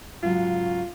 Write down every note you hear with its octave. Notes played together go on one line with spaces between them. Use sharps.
G#2 C#3 F#3 F4